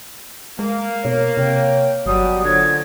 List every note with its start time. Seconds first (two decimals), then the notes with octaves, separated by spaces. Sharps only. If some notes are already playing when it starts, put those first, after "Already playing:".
0.59 G#3 A#3
1.05 B2 C#5
1.37 C3 G5
2.06 G1 B2 F#3 G3 D#6
2.45 A#2 D3 F3 F#3 G#6